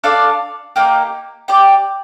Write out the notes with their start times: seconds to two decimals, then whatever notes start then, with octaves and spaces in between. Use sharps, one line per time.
0.04 D4 A4 D5 F5
0.76 A#3 D#4 G4
1.48 G4 D5 G5